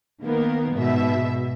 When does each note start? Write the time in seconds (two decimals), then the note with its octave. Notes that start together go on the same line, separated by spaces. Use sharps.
0.22 D#3 A#3 B3 A#4
0.73 G#2 B2 E5